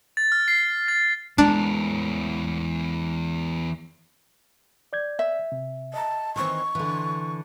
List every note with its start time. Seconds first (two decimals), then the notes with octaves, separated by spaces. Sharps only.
0.17 A6
0.32 F6
0.48 C7
0.88 A6
1.38 E2 G#3 D4 A#4
4.93 D5 G6 G#6
5.19 E5
5.52 C3
5.94 D#5 A5 A#5
6.36 D#3 E3 C4 C#6
6.75 D3 E3